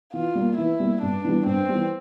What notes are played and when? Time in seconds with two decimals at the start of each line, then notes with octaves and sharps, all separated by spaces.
0.13 E3 F4
0.35 G3 A#3
0.57 E3 E4
0.80 G3 A#3
1.02 G2 D4
1.24 E3 G3
1.46 G2 C4
1.69 E3 G3